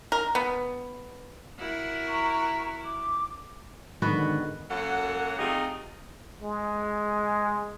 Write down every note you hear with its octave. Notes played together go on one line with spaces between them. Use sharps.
A#4
B3
E4 F#4 A#4
A#5 C#6
D6
G#2 D3 D#3 B3 F#4 B4
F#2 F#3 A#3 A4 F#5
C3 A3 D#4 F4 G4 G#4
G#3